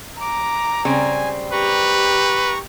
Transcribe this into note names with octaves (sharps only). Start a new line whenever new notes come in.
A#5 D6
C#3 G3 C4 G#5
G4 B4 A#5 C#6